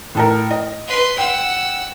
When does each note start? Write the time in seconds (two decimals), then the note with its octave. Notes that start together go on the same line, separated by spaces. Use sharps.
0.15 A2 A4 A#4
0.51 D#5
0.87 B4 C6
1.18 F#5 G5 E6